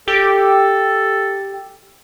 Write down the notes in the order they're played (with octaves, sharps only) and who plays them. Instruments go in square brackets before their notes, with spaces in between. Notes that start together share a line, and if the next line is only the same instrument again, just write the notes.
[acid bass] G4 [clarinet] A4